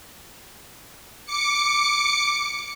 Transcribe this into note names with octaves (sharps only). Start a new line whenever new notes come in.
D6 C#7